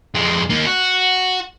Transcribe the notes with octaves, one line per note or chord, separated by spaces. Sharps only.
F2 G#3
A#3 D#4
F#4